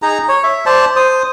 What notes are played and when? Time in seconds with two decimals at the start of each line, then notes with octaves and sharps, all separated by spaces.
0.02 D#4 G#4 A#5
0.28 C#5
0.43 E5
0.66 C5 D5 A5
0.96 C5 D#6